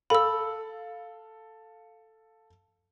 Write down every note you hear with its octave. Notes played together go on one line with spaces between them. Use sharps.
A4 F5 B5 E6